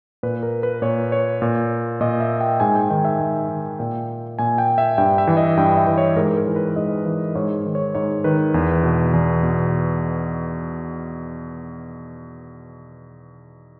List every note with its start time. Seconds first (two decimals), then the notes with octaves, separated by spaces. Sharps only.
0.23 A#2 B4
0.43 A#4
0.63 B4
0.82 A#2 C#5
1.12 C#5
1.42 A#2
2.01 A#2 D#5
2.21 E5
2.41 G5
2.60 G#2 G#5
2.75 G5
2.90 D#3 G5
3.05 E5
3.19 G#2
3.49 D#3
3.79 A#2 G5
4.39 A#2 G#5
4.58 G5
4.78 E5
4.98 G2 G5
5.18 E5
5.27 E3
5.37 D#5
5.57 G2 G5
5.77 E5
5.87 E3
5.98 C#5
6.16 G#2 A#4
6.37 A#4
6.47 E3
6.56 B4
6.76 G#2 D#5
7.06 E3
7.35 G#2 C#5
7.66 D#3
7.75 C#5
7.95 G#2 C#5
8.24 D#3 B4
8.54 E2
8.83 B2
9.13 E2
9.43 B2